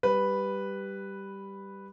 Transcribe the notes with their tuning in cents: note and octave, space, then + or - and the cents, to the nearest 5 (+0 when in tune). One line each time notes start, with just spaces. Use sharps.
G3 +0 B4 +0